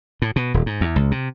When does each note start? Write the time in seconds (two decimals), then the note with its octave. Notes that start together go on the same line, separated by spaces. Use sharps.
0.22 A2
0.36 B2
0.54 D#1
0.66 G#2
0.81 E2
0.96 C#2
1.11 C3